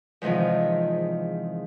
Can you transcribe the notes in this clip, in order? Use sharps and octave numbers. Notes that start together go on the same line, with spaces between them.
E2 G#2 C3 D#3 F3